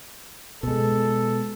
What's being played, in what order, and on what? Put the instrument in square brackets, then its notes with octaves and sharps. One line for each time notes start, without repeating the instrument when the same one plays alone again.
[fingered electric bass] B2 G#3 [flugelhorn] A4